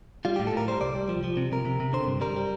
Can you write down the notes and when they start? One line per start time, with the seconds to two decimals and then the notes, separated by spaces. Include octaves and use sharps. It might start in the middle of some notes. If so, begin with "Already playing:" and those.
0.25 G3 F4
0.36 A2 G4
0.47 A4
0.53 A2 A#4
0.68 G3 C5
0.81 C2 D5
0.96 G3
1.09 F3
1.24 F3
1.37 C3
1.52 C3 A#4
1.65 C3
1.80 C3
1.93 D3 C5
2.07 G2
2.21 G3 A#4
2.36 G3